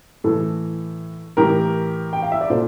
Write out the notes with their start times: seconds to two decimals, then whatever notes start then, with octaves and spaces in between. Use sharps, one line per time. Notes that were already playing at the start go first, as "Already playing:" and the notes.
0.24 A2 E3 A4
1.37 A2 E3 G4 A#4
2.13 G5
2.22 F5
2.32 E5
2.41 D5
2.50 A#2 A4 C5